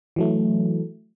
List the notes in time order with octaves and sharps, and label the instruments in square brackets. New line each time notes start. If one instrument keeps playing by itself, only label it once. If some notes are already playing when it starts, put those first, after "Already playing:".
[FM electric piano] E3 F#3 A3